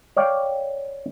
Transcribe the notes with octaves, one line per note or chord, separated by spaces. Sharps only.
C#5 D5 F5 G5